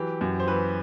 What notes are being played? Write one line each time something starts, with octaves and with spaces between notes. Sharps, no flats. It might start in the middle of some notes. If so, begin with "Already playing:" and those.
Already playing: E3 F#3 G4
F#2
C5
E3 B4